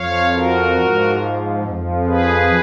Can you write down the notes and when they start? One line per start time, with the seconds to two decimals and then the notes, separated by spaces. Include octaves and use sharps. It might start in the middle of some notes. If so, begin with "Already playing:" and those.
Already playing: F2 F3 C#5 F5
0.33 F#4 A#4
0.77 G#2 F3
1.64 F2 F3
2.07 G#4 B4